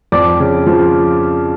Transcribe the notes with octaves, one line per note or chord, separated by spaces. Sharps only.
F2 D5 D6
C#3
F3